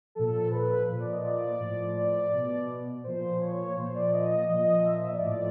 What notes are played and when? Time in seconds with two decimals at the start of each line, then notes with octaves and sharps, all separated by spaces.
0.15 A#2 F3 A4
0.51 B4
0.88 A#2 F3
1.00 D5
1.12 D#5
1.24 D5
1.60 A2 F3
1.96 D5
2.32 B2
3.04 A#2 F3 C5
3.41 C#5
3.77 A#2 F3 C5
3.95 D5
4.13 D#5
4.49 A#2 F3 D#5
4.81 D#5
4.85 E5
5.03 E5
5.08 D#5
5.12 D5
5.21 A2 F3